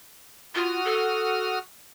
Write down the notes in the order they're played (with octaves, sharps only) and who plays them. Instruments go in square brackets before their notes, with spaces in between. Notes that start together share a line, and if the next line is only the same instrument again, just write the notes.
[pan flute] F4 [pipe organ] F#4 D#6 F6
[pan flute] A4